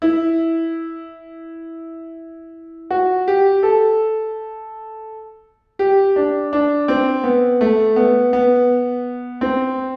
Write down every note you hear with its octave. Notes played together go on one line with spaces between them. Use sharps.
E4
F#4
G4
A4
G4
D4
D4
C4
B3
A3
B3
B3
C4